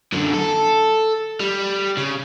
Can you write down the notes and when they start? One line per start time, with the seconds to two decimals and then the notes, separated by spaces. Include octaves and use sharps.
0.12 F#2 D3
0.34 A4
1.40 G3
1.97 C#3